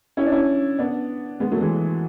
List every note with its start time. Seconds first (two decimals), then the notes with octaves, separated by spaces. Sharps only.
0.17 C#4 E4
0.26 D4
0.32 C#4 E4
0.79 B3 D4
1.40 G#3 B3
1.52 F#3 A3
1.61 E3 G#3